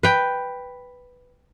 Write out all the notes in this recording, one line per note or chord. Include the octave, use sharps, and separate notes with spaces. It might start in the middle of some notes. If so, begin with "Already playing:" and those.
B4 G5